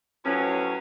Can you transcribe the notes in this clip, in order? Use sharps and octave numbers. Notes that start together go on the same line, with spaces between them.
A2 F3 F#3 C#4 B4